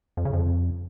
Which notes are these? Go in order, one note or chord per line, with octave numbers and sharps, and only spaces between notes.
F2
C#3
F2